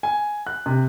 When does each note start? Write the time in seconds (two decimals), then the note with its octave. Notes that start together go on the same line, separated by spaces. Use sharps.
0.03 G#5
0.47 F#6
0.66 C3